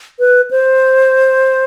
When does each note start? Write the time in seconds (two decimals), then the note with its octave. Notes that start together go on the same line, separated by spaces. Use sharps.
0.19 B4
0.51 C5